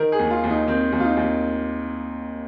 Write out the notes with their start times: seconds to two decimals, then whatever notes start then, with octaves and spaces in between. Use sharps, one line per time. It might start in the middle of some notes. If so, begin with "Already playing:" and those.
Already playing: D#3 A#4
0.12 G#4
0.19 D#2
0.30 F4
0.44 D#2
0.50 D#4
0.67 D#3 C4
0.92 D#2
1.00 F4
1.04 D#4
1.17 D#2